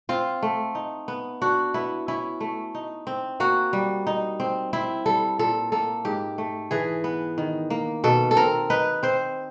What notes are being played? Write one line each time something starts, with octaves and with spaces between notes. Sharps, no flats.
C4 F4
A3
D#4
B3
D4 F#4
B3 E4
C#4 E4
A3
D#4
C4
A#3 F#4
G3
D#4
C4
C4 E4
G3 A4
A#2 A4
A#3 A4
G#2 G4
A3
E3 G#4
B3
D#3
A#3
B2 A4
A4
C4 A#4
D#4 B4
C4 C5